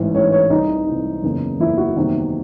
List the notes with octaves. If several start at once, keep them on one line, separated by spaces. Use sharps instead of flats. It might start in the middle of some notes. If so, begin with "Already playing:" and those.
Already playing: A1 G#2 E3
A1 G#2 E3 C#5
C#5
C2 C3 E3 D#4
C2 C3 E3
F#1 E2 C#3
F#1 E2 C#3 E4
F#4
F#1 E2 C3 D#3